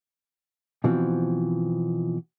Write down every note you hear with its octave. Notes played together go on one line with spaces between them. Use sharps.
B2 E3 F3 C4